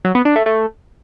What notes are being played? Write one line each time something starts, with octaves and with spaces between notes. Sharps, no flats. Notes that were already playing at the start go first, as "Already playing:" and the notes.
F#3
B3
D4
A3
A3